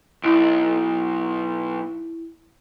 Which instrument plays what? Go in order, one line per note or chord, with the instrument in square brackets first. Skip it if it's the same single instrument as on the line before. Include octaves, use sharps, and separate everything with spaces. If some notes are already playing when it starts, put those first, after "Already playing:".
[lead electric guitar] B1 [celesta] E4 D7